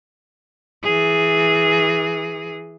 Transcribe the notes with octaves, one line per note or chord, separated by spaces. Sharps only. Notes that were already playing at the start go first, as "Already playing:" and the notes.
E3 G#4